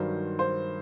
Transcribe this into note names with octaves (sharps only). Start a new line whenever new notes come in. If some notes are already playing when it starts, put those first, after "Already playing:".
Already playing: G2 D#3 F#3 C5
C5